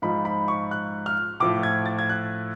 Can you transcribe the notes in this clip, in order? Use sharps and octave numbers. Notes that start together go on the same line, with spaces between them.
G#2 F3 G#3 B5
B5
C#6
F#6
F6
A2 F3 A3 D6
G#6
A6
G#6
F#6